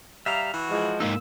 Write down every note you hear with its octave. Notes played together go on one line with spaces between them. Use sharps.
G3 E5 F5 A#5
E3 F#4
F3 G#3
G#2 A#3 D#4 E6